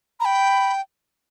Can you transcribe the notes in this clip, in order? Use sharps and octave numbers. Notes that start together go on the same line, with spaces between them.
A#5 B5
G5